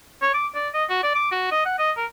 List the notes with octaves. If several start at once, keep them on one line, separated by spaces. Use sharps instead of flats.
C#5
D6
D5
D#5
F#4
D5
D6
F#4
D#5
F#5
D#5
A#4